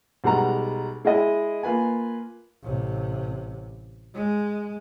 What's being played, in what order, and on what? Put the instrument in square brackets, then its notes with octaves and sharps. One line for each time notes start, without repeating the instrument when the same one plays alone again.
[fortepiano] B1 G3 G#3 F#5 A#5
G#3 E4 G#4 D#5
A#3 F4 B4 G#5
[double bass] A1 C3
G#3